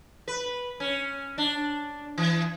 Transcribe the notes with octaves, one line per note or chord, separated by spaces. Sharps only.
B4
C#4
D4
E3